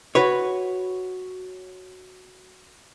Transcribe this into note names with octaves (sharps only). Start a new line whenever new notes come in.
F#4 B4 C#5